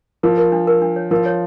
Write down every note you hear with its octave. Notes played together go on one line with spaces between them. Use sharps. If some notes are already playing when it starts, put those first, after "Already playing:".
F3 A#4
A#4
D4
A#4
D4
C#5
F3 A#4
C#5